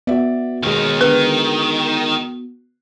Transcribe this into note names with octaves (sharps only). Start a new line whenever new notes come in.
B3 F#4 D5 E5
D#2 B2 D#3 G#3
D3 D#3 G#3 B4